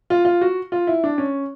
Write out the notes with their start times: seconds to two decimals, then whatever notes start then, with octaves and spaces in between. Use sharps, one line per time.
0.10 F4
0.25 F4
0.41 F#4
0.72 F4
0.87 E4
1.04 D4
1.18 C#4